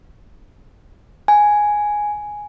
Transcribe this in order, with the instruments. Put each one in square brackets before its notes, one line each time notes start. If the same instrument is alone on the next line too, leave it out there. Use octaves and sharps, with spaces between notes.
[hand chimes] G#5